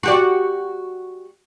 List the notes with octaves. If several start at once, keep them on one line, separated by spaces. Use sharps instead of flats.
F#4 G4 D5